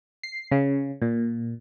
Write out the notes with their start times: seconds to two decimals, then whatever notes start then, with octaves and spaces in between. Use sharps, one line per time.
0.23 C7
0.51 C#3
1.02 A#2